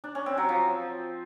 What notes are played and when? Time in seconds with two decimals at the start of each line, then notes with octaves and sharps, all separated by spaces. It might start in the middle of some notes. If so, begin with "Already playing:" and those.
0.04 D4
0.15 C#4
0.26 C4
0.37 F#3
0.49 F3